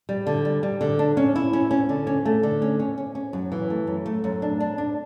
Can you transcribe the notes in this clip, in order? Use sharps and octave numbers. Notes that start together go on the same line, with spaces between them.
G3
D3
G3
G3
D3
D4
C#4
E4
C#4
C#4
D3
C#4
A3
D3
C#4
C#4
C#4
C#4
F#2
E3
A3
F#2
A3
F#2
D4
D4
D4